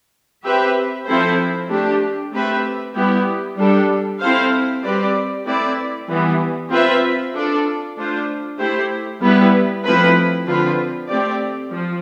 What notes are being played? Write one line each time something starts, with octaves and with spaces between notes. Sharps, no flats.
C4 G4 B4 E5
F3 C4 E4 A4 C5
A3 D4 G4
A3 C4 G4 B4 E5
G3 B3 E4 G4
G3 D4 A4
C4 E4 A4 C5 F5
G3 C4 G4 B4 D5
A3 C4 E4 B4 D5
E3 G3 B3
C4 F4 B4 E5
D4 F4 A4 D5
A3 D4 F4 C5
A3 E4 G4 C5
G3 B3 E4 B4
F3 A3 C4 E4 B4
D3 F3 C4 F4 B4
A3 C4 G4 D5
F3